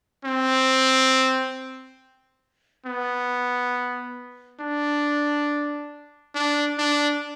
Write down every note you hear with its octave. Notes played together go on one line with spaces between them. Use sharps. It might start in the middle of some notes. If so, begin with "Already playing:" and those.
C4
B3
D4
D4
D4